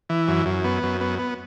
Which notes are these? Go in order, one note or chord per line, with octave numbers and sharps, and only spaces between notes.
E3
F#2
F#2
B3
F#2
B3
B3